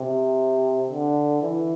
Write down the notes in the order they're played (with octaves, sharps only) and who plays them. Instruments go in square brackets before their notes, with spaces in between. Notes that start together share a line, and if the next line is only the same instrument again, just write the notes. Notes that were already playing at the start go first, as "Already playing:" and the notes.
Already playing: [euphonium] C3
D3
E3